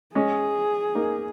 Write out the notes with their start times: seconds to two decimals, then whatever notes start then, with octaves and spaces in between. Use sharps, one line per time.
0.15 G#3 C#4 G#4
0.95 A#3 D#4